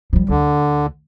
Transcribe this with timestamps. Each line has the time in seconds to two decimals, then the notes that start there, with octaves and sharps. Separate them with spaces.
0.13 F3 G3
0.29 D2 D3